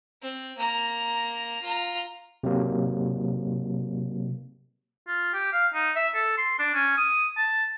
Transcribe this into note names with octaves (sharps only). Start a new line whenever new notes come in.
C4
A#3 A#5
F4 A#5
C3 F#3 A#3
F4
G4
F5
D#4
E5
A4
C6
D4
C#4
D#6
A5